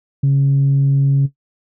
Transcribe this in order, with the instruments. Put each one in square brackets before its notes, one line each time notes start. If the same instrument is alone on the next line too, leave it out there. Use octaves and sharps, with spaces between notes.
[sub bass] C#3